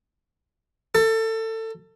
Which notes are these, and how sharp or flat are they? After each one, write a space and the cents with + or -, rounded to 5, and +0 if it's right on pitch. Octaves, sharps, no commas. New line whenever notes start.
A4 +25